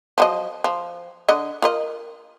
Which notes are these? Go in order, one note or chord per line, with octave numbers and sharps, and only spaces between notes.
F3 F#3 D#5
F3
D3 D#5
F4 A#4 D#5